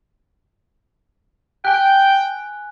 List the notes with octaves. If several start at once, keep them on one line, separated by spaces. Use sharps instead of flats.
G5 G#5 F#6